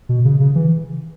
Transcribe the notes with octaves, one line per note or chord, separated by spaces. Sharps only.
B2
C#3
C#3
E3